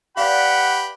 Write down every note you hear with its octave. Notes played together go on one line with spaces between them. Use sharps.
G4 B4 D5 F5 F#5 B5